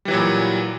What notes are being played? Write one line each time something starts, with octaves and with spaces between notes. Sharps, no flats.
A#2 E3 F#3 G3